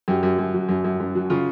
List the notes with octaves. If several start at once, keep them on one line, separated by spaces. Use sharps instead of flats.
F#2 G4
F#2
F#2
F#3
F#2
F#2
F#2
F#3
C#3 F4